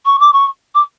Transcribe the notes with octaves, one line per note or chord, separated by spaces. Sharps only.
C#6
D6
C#6
D6